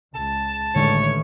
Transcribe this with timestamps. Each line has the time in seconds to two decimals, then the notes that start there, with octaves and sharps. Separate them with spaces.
0.15 C#2 A5
0.76 A1 D3 D#3 G#3 A3 C#5